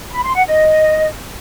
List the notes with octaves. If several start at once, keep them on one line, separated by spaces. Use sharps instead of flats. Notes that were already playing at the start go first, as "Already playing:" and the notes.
B5
C6
F#5
D#5